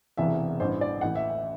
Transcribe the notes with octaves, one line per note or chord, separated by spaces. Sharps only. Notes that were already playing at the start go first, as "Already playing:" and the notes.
E1 E2 C3 E5
A1 G2 E3 C5
D5
A1 A2 E3 F#5
E5
E5